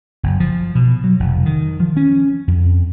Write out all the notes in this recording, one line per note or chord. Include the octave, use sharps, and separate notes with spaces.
F#1
F3
B2
F#3
F1
D#3
F3
C#4
F2